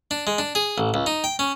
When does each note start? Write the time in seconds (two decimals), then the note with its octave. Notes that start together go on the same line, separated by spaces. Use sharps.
0.11 D4
0.27 G#3
0.38 D4
0.55 G#4
0.78 A1
0.94 C#2
1.06 D#4
1.24 G5
1.39 C#4